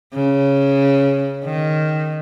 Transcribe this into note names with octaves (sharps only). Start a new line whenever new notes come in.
C#3
D#3